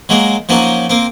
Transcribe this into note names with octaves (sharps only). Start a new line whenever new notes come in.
F#3 G#3 A#3
F3 F#3 A#3 C#4 D#4
A#3 C4